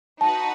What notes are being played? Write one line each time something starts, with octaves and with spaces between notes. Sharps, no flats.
D#4 F#4 B4 F#5 A5